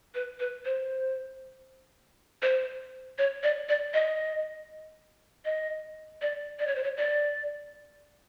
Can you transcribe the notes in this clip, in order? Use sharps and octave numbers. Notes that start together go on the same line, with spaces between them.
B4
B4
C5
C5
C#5
D5
D5
D#5
D#5
D5
D5
C#5
C5
C#5
D5